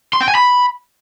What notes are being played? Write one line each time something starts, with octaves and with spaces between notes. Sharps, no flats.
C6
G5
G#5
B5